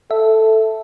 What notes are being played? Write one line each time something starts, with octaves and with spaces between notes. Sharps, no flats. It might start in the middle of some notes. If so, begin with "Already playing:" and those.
A4 E5